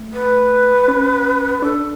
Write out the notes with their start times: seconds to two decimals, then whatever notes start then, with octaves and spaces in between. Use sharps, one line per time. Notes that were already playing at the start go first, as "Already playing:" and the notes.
Already playing: A3
0.13 B4
0.88 C#4
1.62 D4 A4